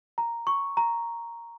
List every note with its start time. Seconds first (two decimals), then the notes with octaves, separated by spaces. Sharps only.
0.18 A#5
0.47 C#6
0.77 A#5